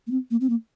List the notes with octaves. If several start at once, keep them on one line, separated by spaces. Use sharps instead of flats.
A#3
C4
A#3
C4
A#3